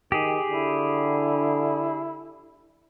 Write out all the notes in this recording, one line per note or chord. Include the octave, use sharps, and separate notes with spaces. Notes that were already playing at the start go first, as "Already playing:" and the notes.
D#3 G4 G#4
D3 E4